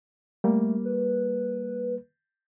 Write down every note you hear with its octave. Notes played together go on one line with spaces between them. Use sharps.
G3 A3 A#3
B4